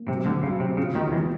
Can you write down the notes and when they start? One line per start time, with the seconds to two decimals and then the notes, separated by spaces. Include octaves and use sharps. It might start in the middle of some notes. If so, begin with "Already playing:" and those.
Already playing: A#3
0.08 C3 F#3
0.26 D2 D3
0.43 C#3 F#3
0.60 C3
0.77 C#3 F4
0.95 D#2 D#3
1.12 E2 E3 G#3